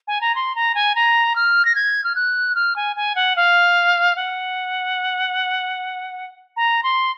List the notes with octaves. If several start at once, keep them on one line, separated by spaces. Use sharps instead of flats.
G#5
A#5
C6
A#5
G#5
A#5
F6
A#6
G#6
F6
F#6
F6
G#5
G#5
F#5
F5
F#5
A#5
C6